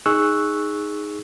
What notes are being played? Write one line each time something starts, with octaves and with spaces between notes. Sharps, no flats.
D#4 G#4 C#6 E6 F#6